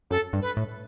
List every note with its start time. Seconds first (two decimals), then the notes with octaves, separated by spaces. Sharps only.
0.10 F#2 A4
0.33 G2
0.41 B4
0.57 A2